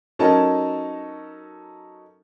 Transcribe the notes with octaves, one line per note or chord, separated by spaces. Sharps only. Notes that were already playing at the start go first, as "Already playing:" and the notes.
F#3 C#4 D#4 A4 A#4 A5